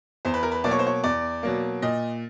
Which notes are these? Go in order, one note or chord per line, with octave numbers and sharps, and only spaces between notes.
E2 C5
B4
A#4
B4
B2 F#3 A#3 D5
C#5
C5
C#5
E2 D5
B2 F#3 A#3
A#2 D#5